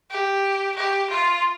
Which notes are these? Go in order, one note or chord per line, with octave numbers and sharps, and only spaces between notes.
G4
G4
F4